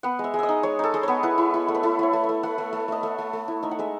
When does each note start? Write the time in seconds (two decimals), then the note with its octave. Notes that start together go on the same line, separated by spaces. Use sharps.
0.03 B3 F#5
0.19 G#3 E5
0.34 G#3
0.39 D#5 E5
0.49 D#4
0.63 G#3 C#5
0.79 D#4 A4
0.94 G#3 D#5
1.03 B3 C#5
1.23 E4 B4
1.38 E4
1.54 E4
1.68 A3
1.75 B4
1.83 E4 A4
1.99 A3 C#5
2.13 A3
2.24 E5
2.29 A3
2.43 A3 F#5
2.58 A3
2.73 A3
2.88 A3 D#5
3.03 A3 E5
3.18 A3
3.33 A3
3.48 E4
3.63 D#4 E5
3.71 F#5
3.79 G#3 E5